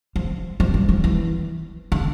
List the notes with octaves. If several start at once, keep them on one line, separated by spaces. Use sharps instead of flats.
F3
F3
G3
F3
E3
D3